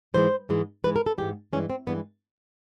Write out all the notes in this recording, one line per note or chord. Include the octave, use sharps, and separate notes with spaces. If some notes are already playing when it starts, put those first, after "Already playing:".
G#2 E3 G#3 C5
G#2 E3 G#3
G#2 E3 G#3 B4
A#4
A4
G#2 E3 G#3 G4
G2 E3 G#3 C#4
C4
G2 E3 G#3 B3